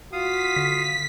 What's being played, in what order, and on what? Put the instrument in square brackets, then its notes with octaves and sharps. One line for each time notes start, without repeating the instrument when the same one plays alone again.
[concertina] F4 F5 D#6 [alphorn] F#4 [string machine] B6
[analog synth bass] D3